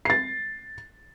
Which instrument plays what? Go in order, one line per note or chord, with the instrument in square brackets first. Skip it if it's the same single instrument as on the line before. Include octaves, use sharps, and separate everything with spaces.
[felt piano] A6 C7